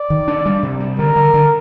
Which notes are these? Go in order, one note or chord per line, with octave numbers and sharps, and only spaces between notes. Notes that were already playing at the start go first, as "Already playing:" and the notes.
Already playing: D5
D#3
D4
G3
C3
G3
D3 A#4
D3
D3